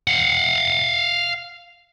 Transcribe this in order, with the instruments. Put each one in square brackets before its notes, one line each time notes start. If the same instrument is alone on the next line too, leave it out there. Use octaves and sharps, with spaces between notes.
[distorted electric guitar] F5 F#5